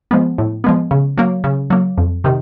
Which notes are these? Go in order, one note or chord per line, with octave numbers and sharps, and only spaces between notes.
F3 G#3 B3
A2
F3 G#3 B3
C#3
F#3 A#3
C#3
F#3 A#3
F2
C3 D#3